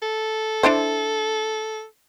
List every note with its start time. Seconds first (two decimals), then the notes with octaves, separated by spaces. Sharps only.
0.02 A4
0.63 D4 E4 C5